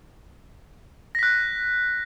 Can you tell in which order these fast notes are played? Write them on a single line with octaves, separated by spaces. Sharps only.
A#6 B6 F#6